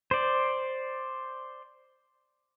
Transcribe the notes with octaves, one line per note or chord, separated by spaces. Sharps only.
C5 D5